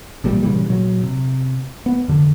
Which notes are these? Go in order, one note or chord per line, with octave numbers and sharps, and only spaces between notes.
A1 A#2 G3
A#2 C#3 E3 G3
A#2 F#3
C3
B3
F2 D3